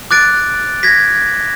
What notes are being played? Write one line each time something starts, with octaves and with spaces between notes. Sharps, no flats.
D6 F#6 A6 D7
G#6 A#6 B6